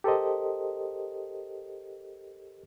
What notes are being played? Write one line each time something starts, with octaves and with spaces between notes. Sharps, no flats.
G4 A4 A#4 C5 D#5